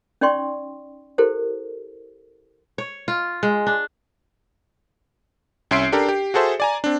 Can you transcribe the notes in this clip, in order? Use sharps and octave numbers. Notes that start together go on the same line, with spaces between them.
C#4 D#4 D5 G5 C6 C#6
E4 G4 A4 A#4 C5
C#5
F4
G#3
D4
C2 C#4 E5 C6 C7 D7
D4 G4 A4 A#4
G4
F#4 G#4 A4 C5 E5
D5 G#5 A#5
C4 D4